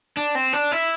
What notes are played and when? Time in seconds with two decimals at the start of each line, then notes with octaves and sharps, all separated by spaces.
0.17 D4
0.35 C4
0.53 D4
0.72 E4